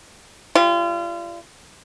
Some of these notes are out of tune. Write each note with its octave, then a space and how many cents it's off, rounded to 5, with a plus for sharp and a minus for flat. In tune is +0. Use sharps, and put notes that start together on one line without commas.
G3 +0 F4 -35